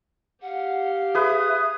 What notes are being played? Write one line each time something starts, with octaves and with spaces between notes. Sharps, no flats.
G4 F5 F#5
G#4 B4 E5 D#6